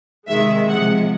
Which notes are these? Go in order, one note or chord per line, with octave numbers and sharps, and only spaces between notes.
C3 D#3 G#3 E5
C3 F3 G#3 F#5